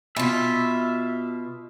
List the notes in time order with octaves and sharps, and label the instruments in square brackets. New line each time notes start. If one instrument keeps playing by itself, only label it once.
[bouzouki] B2 F4 [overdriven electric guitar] E5